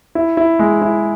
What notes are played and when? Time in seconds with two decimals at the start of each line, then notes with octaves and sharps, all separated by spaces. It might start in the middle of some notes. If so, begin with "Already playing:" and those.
0.15 E4
0.37 E4
0.59 G#3
0.82 E4